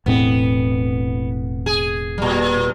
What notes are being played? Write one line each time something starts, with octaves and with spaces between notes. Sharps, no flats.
E1 A2 B3 C4
G#4
A#2 G3